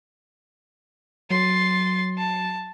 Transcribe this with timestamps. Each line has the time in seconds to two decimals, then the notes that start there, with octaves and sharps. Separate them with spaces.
1.30 F#3 C6 A6
2.18 A5